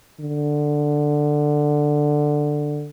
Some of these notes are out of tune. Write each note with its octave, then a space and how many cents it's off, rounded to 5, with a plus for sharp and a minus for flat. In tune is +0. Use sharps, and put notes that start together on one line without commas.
D3 +10